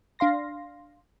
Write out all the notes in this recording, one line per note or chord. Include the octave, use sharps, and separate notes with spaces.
D4 F5 C6 A#6